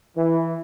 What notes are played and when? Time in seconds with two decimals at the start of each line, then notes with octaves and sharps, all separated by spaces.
0.16 E3